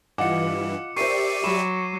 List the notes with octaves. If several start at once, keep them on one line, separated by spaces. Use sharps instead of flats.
G2 E3 F4 D#5 F#5 D6 C#7
G4 A#4 C5 D5 E5 C#6 C7 D#7
F#3 B5 E7